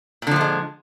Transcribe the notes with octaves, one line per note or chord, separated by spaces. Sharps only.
A#2 D3 F3 G#3 A3